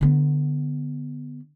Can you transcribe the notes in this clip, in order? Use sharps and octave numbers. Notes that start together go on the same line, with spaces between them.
D3 B3